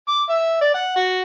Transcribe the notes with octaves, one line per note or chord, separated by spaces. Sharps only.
D6
E5
D5
F#5
F#4